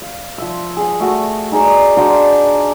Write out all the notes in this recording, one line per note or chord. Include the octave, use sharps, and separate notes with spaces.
F5
F3 E5
G#4 F#5
A3 F#4
D#4 G#4 D5 A#5
D4 F#4 A#4 C5